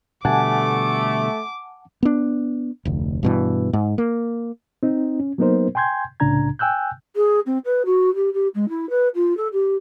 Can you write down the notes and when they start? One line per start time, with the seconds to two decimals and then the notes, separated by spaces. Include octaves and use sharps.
0.25 B2 D3 G3 A3 F#5 G#5 A5 D6
2.03 B3 D4
2.85 F1 D2
3.23 G2 B2 E3
3.73 G#2
3.98 A#3
4.83 C4 D#4
5.20 C#4
5.38 F#3 A#3 B3 D#4 A#4 C5
5.75 G5 G#5 C6 G6 G#6
6.20 C2 A2 C#3 D4 A#5 G#6
6.59 G5 G#5 E6 F#6 G6
7.16 G#4
7.46 C4
7.65 B4
7.86 F#4
8.15 G4
8.33 G4
8.55 G#3
8.69 E4
8.90 B4
9.15 F4
9.37 A4
9.53 G4